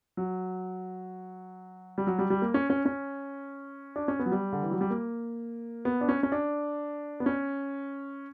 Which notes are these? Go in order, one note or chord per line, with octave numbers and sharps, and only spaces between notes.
F#3
G3
F#3
G3
G3
A#3
C#4
C#4
C#4
D4
C#4
B3
F#3
G3
D3
E3
F#3
G3
A#3
B3
D4
C#4
C#4
D4
B3
C#4